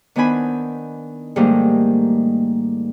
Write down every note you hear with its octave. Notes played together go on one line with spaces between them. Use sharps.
D#3 B3 D4 C5 G#5 B5
G#2 D#3 G3 A3 A#3 C5